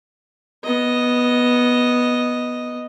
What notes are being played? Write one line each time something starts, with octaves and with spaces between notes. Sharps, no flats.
B3 D#5